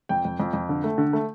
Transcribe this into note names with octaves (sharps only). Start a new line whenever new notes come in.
F2 G5
F2
F2
F2
D3
A3
D3
A3